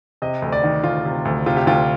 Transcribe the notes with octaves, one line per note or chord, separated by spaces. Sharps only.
C3 D#5
D2
D5
D#3
D2 F4
C3
D2
C3 F4
G4
D2 F4